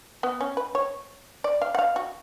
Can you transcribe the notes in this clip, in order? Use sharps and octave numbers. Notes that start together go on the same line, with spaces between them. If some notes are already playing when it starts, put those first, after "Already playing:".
B3
C#4
B4
C#5
D5
F5
F#5
F5
F#4